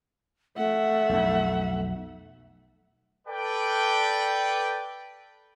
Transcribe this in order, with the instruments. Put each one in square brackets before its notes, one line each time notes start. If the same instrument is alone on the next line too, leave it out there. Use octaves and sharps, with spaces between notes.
[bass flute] A3 [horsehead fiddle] E5 F#5
[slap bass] B1 F2
[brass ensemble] A4 B4 D5 G5